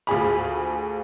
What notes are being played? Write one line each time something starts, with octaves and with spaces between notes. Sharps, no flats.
D2 F4 G#4 B5